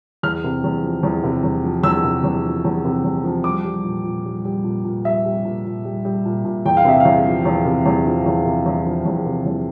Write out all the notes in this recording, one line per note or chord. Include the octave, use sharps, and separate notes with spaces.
E2 F6
C3
E2
F3
E2
C3
E2
F3
E2 E6
C3
E2
F3
E2
C3
E2
F3
G3 D6
G3
A#2
A#2
G3
G3
A#2
A#2
G3 E5
G3
A#2
A#2
G3
G3
A#2
A#2
E2 G5
F5
C3 E5
E2 F5
F3
E2
C3
E2
F3
E2
C3
E2
F3
E2
C3
E2